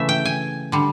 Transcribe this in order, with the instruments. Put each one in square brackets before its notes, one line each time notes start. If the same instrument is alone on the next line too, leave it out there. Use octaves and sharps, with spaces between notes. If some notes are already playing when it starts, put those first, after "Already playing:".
Already playing: [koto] C#3 E3 A3 E5
G5
G#5
D3 G3